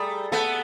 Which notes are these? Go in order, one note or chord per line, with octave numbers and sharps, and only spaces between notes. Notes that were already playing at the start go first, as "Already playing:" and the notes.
Already playing: G3 A3 G#4 A#4
A3 B3 A4